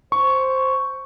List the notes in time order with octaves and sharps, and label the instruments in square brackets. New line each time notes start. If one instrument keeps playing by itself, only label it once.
[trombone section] C5 [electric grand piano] C#6